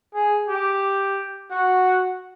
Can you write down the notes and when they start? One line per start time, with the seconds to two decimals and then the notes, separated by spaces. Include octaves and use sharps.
0.14 G#4
0.48 G4
1.51 F#4